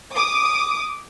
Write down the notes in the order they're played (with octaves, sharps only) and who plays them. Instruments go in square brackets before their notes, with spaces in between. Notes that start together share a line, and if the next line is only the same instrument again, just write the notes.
[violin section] D6 D#6